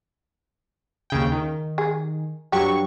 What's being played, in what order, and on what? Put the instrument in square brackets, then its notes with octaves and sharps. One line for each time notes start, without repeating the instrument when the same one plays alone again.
[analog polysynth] D#2 C#3 G5
D#3
[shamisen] G#4
[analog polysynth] G2 F#3 C#6 [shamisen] G4